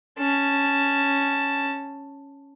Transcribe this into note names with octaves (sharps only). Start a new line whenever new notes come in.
C#4 A5